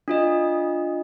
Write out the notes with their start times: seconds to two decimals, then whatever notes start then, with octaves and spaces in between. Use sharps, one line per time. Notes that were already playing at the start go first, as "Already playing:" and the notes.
0.08 D4 F4 D#5